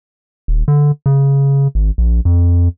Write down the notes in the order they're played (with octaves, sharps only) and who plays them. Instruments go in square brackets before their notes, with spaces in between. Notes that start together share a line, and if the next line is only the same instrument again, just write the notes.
[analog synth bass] D#1
D3
C#3
G#1
A#1
F2